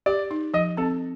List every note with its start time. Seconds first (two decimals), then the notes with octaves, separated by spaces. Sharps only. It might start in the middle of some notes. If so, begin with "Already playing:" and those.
0.06 G4 D5
0.31 D#4
0.54 F3 D#5
0.77 C4 A4